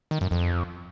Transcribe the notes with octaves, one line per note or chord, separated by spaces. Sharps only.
D#3
F#2
F2